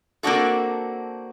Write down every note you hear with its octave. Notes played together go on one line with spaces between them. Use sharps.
A#3 C4 D4 F#4 A4